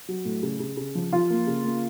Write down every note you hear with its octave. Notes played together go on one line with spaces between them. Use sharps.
F#3
A2
C#3
C#3
C#3
F3
F3 F4
A#3
C#3
A#3